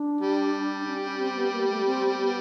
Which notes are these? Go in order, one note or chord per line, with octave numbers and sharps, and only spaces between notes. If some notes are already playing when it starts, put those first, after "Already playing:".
Already playing: D4
G3
D4
C#4
C#4
C4
B3
A#3
A3
C4
B3